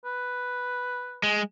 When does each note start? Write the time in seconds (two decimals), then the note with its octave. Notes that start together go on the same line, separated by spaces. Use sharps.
0.05 B4
1.23 G#3